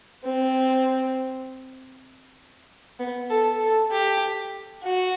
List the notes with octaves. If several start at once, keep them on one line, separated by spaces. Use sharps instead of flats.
C4
B3
A4
A4
G4
F#4